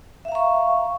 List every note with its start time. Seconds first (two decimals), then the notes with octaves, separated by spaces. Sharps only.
0.25 E5
0.28 F5
0.32 A#5
0.35 C#6